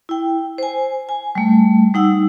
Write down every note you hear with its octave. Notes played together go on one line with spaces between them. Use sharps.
E4 G5
C5 G#5
G#5
G3 A3
G3 D#4 F#5 E6